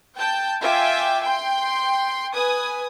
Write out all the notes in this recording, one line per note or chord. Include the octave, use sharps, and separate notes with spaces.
G5 A5 G6
F4 E5 G5 G#5 D6
G5 C6
B4 G#5 D#6